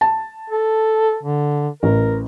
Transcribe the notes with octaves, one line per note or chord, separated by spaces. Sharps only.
A5
A4
D3
A1 A#4